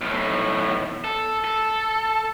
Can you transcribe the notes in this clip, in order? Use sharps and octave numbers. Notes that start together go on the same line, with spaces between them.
B1 A2
A4
A4